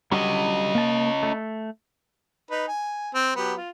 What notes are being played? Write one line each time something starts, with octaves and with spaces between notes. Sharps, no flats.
D3 F#3 G3 C#4 D#5
A#3 A5
A3
D#4 B4
G#5
C4
F#3 B3 G4
F4